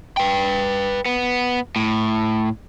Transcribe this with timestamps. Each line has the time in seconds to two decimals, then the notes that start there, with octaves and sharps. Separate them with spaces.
0.17 B4 G5
1.06 B3
1.76 A2